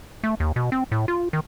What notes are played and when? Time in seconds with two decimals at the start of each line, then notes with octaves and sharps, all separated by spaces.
0.24 A3
0.40 D#2
0.56 B2
0.72 C4
0.92 A2
1.08 F4
1.33 D#3